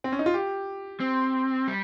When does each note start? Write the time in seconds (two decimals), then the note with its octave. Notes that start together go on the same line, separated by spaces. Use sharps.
0.04 C4
0.12 C#4
0.19 D#4
0.26 F4
0.34 G4
1.00 C4
1.67 G3